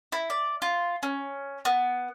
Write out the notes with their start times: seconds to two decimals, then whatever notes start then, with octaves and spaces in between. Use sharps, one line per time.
0.12 E4
0.30 D5
0.62 F4
1.03 C#4
1.65 B3